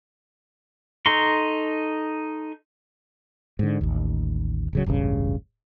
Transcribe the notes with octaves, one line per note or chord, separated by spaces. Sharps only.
D#4 A4 A#5 C6 C#6
G#2 D3
A1 D#2
D1 C#3 F#3
E1 A1 G2 C#3